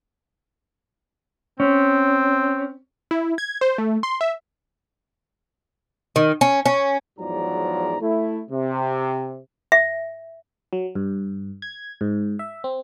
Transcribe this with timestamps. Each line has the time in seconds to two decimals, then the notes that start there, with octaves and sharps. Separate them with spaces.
1.60 C4 C#4
3.11 E4
3.38 G#6
3.61 C5
3.78 A3
4.03 C6
4.21 E5
6.16 D#3
6.41 C#4
6.66 C#4
7.18 E2 G#2 F3 F#3 D5 A#5
8.01 A3 E4
8.50 C3
9.72 E5
10.73 F#3
10.95 G2
11.62 G#6
12.01 G#2
12.39 E5
12.64 C4